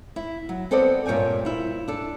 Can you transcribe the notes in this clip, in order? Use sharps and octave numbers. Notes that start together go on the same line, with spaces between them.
E4
F#3
B3 C4 A4 C5 D5 D#5
G2 A#2 C#5 G5 G#5
E4 F4
D4 A4